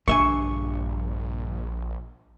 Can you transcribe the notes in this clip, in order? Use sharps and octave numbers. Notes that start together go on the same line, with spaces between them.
A#1 G2 D3 E5 G#5 C#6